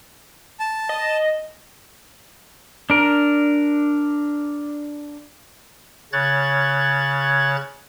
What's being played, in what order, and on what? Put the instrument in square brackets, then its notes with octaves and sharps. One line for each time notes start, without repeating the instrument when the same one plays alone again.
[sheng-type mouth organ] A5
[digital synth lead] D#5
[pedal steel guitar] D4 A#4
[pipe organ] C#3 C#5 F#6 G#6 A6